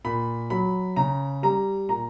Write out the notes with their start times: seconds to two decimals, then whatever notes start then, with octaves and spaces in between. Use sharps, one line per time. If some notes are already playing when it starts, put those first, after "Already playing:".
0.04 A#2 B5
0.50 F#3 B5
0.96 C#3 A#5
1.43 G3 A#5
1.89 A#2 A#5